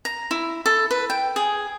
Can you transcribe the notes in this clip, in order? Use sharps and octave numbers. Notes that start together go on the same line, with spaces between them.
A#5
E4
A4
B4
G5
G#4